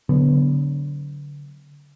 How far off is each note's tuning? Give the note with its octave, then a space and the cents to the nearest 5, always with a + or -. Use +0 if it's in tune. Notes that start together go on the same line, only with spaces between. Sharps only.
D3 -25 F#3 +0 B3 +0